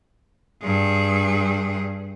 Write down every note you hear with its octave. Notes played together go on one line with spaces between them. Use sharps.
G2 G#4